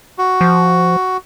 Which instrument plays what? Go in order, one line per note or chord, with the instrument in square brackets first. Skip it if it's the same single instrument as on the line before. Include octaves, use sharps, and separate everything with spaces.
[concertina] F#4
[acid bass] F3